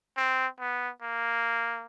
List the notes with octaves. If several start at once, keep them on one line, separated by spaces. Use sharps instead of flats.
C4
B3
A#3